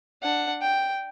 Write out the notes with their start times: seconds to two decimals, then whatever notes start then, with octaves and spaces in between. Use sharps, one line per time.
0.22 D4 F#5
0.62 G5